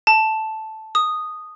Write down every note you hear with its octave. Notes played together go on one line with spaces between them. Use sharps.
A5
D#6